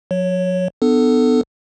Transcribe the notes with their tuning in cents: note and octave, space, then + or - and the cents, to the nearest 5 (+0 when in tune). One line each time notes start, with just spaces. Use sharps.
F#3 -45 C#5 +0
B3 +15 D4 +35 A4 +5